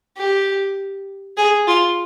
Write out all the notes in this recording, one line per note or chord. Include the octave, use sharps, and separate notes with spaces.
G4
G#4
F4